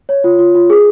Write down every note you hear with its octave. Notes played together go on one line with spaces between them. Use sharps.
C#5
F4
F4
F4
G#4